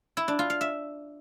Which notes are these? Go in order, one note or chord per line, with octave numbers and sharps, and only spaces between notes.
E4
D4
F4
F5
E5